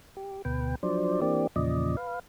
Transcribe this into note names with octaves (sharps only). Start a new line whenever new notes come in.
G4
D2 B2 B4 G5
F3 F#3 D4 C5 D5
E3 A#3 C4 D4 G4 D5
E2 A#2 C#3 F3 D5 D#5
B4 F5